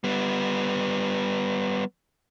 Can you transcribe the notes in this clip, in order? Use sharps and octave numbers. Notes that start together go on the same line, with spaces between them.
G3 B3